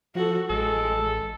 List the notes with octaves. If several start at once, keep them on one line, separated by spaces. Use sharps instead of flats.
F3 F#4 A4
A1 G#3 A4